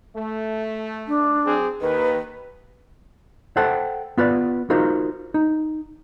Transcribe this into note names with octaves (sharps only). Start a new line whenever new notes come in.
A3
D4
F#3 C4 G#4
D#2 D#3 B4
A4 C5 F#5 G5 A5
B3 F4 B4 D5
D#4 F4 F#4 A#4 C5
D#4